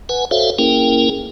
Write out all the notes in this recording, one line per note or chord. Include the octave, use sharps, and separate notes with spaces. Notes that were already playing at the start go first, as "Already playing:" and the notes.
B4 F#5 G#5
F#4 A4 C5 C#5 E5 F5
A#3 C#4 E4 G#4 A#4 G5